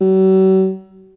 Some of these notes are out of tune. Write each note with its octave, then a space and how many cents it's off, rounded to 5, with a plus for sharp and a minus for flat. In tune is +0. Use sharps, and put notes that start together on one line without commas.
F#3 +45